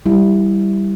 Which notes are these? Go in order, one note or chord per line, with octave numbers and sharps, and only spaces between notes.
G3 E4